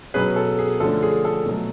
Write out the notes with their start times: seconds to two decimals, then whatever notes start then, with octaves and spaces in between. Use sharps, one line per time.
0.14 B2 F#3 C#4 G#4 B4
0.36 A4
0.59 G#4
0.80 D3 F3 A3 C#4 A4
1.02 G#4
1.25 A4
1.46 B2 F#3 A3